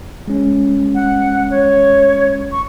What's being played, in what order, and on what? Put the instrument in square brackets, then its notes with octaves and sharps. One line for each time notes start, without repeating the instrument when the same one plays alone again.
[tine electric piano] G#3 C#4
[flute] F#5
C#5
[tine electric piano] G1 [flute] C#6